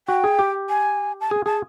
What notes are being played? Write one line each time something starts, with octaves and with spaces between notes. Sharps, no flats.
F#4 G5
G#4
G4
G#5
A5
G#4 G#5
G#4 A5